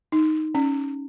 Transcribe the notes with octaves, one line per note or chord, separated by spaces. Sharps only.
D#4
C#4